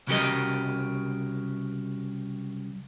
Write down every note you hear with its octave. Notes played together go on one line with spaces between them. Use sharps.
C2 C#3 F#3 G4 A#4 D#5